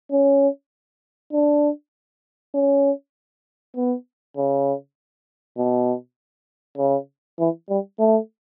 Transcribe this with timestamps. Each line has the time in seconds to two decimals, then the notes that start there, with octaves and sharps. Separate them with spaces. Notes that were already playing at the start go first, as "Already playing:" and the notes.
0.12 C#4
1.33 D4
2.55 C#4
3.76 B3
4.37 C#3
5.58 B2
6.78 C#3
7.39 E3
7.69 G3
7.99 A3